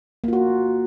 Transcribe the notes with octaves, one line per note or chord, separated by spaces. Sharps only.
A#3 F4 F#4